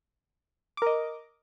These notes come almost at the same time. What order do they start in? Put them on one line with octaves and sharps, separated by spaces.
D6 A#4 D#5